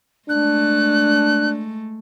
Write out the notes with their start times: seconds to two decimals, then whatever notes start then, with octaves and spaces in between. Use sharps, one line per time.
0.29 G#3 A3 D4 F#6